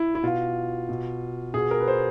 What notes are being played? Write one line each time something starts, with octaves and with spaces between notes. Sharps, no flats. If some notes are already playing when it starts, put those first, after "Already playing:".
Already playing: E4
E4
B2 F4
B2
B2 G#4
A#4
B4
C5